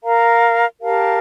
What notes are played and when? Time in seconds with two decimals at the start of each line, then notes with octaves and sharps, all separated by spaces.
0.03 A#4 F5 A#5
0.81 G4 A#4 F5 A5